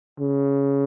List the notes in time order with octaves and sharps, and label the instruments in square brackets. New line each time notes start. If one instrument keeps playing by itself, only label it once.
[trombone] C#3